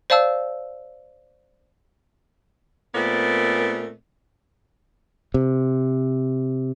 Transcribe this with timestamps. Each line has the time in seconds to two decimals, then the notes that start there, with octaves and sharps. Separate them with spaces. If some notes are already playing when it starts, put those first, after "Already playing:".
0.10 C5 D5 F5 A5 E6
2.95 A#2 A3 B3 C4 A#4 D5
5.34 C3